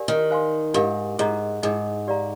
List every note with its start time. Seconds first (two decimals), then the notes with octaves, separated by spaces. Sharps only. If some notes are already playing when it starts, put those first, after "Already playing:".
Already playing: G4 A#4 D5 F5 G#5
0.08 D#3
0.31 C5 F5 G#5 C6
0.74 G#2 D4 G4 A#4 F5
1.19 G#2 G#4 D#5 A#5
1.63 G#2 D#4 G#4 D#5
2.07 G4 D5 F5 A#5